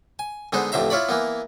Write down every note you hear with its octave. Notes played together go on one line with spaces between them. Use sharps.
G#5
D3 G#3 B3 D#4 C5
A1 F2 D3 C5 E5 A#5
E4 F4 C#5 D5 B5
E3 A#3 B3